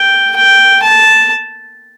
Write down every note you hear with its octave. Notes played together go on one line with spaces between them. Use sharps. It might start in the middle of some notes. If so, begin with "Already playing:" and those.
Already playing: G5
G5
A5